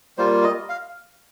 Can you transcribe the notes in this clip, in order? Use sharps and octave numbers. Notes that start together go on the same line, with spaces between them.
G3 A#3 F4 C5
D#5
F5